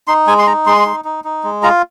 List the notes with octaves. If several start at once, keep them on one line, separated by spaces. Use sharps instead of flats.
D#4 C6
G#3 G#5
C6
D#4 A#5
G#3 C6
D#4
D#4
D#4
G#3
F4 A#5